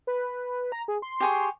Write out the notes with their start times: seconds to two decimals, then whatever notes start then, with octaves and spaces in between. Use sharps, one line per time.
0.07 B4
0.72 A#5
0.88 G#4
1.02 C6
1.20 G4 G#4 C#6